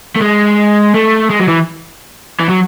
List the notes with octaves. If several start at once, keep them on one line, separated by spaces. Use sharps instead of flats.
A3
G#3
A3
G#3
F#3
E3
E3
F#3